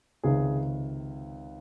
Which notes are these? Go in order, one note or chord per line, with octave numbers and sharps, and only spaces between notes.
C#2 C3 D#3 G#4